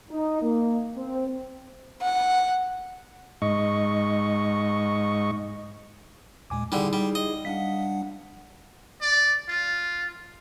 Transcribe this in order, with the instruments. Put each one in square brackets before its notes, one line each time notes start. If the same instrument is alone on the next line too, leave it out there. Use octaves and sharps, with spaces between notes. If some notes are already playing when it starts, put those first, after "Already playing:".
[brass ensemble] D#4
A#3
C4
[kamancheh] F#5
[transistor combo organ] G#2 D#5 C#6
[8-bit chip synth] D#2 A#2 G#3 [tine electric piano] G#5 D6
[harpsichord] D3 G3 [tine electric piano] D#4 [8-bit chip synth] E4 G#4
[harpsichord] G3
D#5
[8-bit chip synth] G3 D4 F#5 [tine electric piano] F5 B6
[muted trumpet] D5
F4